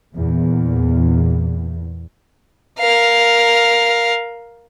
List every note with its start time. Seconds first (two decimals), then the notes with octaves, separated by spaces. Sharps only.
0.13 E2 A#2
2.79 A#4 F5